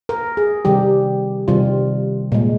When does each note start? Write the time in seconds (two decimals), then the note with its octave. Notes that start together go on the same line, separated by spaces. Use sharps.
0.09 A#4
0.37 G#4
0.65 C3 D#3 G3 G4
1.48 C3 D#3 G3 F4
2.32 A#2 G#3